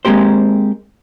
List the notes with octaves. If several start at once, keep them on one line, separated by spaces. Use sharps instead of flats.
G#3 A#3 C4 G4 C5